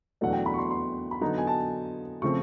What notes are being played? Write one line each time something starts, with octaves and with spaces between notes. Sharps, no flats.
E2 B2 F#3 A3 D4 F#5
G5
B5
C#6
C6
C6
B5
D3 F#3 B3 D#4 A#5
G#5
A5
C#3 F3 A3 C4 C#6